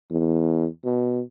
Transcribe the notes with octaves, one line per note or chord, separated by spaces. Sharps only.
E2
B2